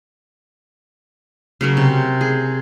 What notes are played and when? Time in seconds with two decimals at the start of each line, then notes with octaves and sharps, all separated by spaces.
1.61 C#3 F#3 A#4
1.77 C3
2.21 G#4